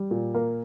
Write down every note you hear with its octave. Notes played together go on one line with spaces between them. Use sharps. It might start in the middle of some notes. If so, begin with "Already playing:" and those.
Already playing: G3
A#2
A#3